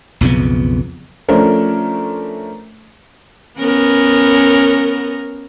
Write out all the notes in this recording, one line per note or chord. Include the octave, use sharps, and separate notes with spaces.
B1 F2 C#3 B3
F3 A3 C#4 D4 A#4 C5
B3 C#4 A#4